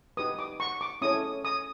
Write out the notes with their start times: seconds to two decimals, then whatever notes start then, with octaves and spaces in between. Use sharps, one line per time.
0.17 D#4 G4 B4 D#6
0.39 D6
0.60 C#6
0.81 D6
1.02 C#4 E4 A4 C#5 D#6
1.45 D#6